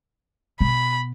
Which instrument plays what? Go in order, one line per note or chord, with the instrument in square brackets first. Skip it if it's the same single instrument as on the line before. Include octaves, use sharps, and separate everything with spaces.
[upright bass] B2 [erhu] B5